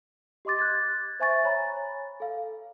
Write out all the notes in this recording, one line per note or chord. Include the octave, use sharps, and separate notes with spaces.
G4 D#5 C6 D6 A6
F#6 G#6 A6
C5 E5 G#5 C#6 A6
C#5 G#5 A#5 B5
A4 F5